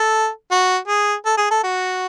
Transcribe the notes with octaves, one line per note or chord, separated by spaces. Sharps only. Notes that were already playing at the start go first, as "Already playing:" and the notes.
Already playing: A4
F#4
G#4
A4
G#4
A4
F#4